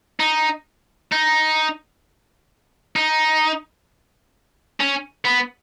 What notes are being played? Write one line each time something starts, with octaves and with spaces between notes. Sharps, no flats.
D#4
D#4
D#4
C#4
B3